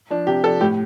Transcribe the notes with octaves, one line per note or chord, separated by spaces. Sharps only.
F3 D4
C3 G4
F3 D4 A4
A2 G4